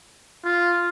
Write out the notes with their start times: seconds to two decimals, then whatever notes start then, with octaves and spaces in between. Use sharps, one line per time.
0.45 F4